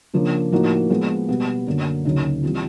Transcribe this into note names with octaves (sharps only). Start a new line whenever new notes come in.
C#3 F3 A#3 D4
A2 F3 A#3 D#4 F#4
F3 G#3 B3
B2 G3 B3
F#2 D3 F#3 A#3
D2 C#3 F#3 A#3 D#4
E3 G3 C4 F4